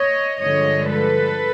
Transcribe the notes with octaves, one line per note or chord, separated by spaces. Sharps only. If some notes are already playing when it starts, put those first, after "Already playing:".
Already playing: C#5 D#5
G2 D3 F3 G#3 C#5 D#5
A4 B4